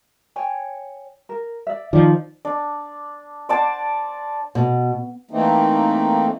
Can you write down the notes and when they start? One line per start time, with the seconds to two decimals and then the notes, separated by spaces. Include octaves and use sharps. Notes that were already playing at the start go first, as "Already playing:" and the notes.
0.36 C#5 G5 G#5
1.29 A#4
1.67 D5 E5
1.93 D#3 F3 D#4 D5
2.45 D4
3.49 C5 D5 F#5 A5
4.55 B2
5.31 E3 A3 A#3 C4 D#4